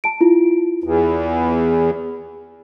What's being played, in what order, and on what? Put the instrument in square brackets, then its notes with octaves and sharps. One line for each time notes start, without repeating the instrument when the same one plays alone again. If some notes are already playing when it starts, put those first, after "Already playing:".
[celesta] A5 D7
E4 F4
[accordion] E2